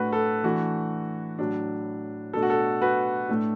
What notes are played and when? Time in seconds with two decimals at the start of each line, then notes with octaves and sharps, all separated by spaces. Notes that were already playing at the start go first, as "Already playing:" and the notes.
Already playing: A2 A3 D4 F#4 B4
0.13 A4
0.44 E3 A3 D4 F#4
1.39 A2 F#3 D4
2.33 B2 A3 D4 A4
2.42 F#4
2.50 A4
2.82 F#4 B4
3.29 A2 A3 D4